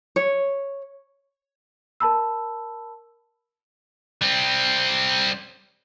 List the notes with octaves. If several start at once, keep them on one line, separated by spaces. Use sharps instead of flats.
C#5
A#4 A5 B5 E6
G3 C4